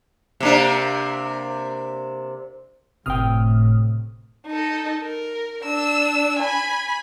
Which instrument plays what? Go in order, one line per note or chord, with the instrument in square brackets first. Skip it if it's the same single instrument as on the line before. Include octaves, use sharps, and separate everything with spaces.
[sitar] C3 A#3 D4
[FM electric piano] G1 D#6 F6 [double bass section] A2 [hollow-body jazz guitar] C3 C4 G5
[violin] D#4 A4
A#4
D4 E6
G#5 B5